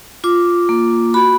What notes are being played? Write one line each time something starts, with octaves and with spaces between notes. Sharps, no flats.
F4 D6
A#3
F#4 B5